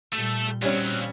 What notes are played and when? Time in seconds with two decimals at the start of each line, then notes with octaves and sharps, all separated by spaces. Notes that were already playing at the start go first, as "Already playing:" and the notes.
0.13 A#2 G3 A3 A4
0.62 D#2 A#2 F#3 G3 C4 C#4